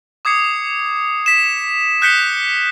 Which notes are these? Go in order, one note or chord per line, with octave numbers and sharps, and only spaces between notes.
D6 D#6 G#6 C7 C#7
B6 E7
D#6 F#6 G6 B6 C#7 G7